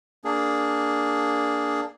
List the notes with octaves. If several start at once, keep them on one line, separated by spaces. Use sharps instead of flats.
A#3 D4 G#4